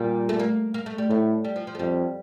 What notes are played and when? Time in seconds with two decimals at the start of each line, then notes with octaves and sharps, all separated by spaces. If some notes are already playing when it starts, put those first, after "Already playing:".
Already playing: A#2 G3
0.29 A3
0.40 A#3
0.74 A#3
0.86 A3
0.98 G3
1.09 A2 A3
1.45 G3
1.56 F3
1.67 F3
1.75 A3
1.79 F2 G3